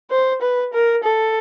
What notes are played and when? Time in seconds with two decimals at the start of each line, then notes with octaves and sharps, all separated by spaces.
0.11 C5
0.41 B4
0.73 A#4
1.03 A4